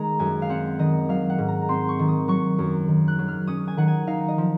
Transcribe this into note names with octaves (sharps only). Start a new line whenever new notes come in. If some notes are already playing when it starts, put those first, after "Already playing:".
Already playing: D#3 G#3 A#5
F#2 G#5
F5
C4 F#5
D#3 D#5
F#3 F5
F#5
G#2
A#5
C4 C6
C#6
D#3
D#6
F#3 C#6
F#2
D#3
F#6
F#3
F6
C#4 D#6
G#5
D#3 F#5
G#5
D#4 F5
D#5
F3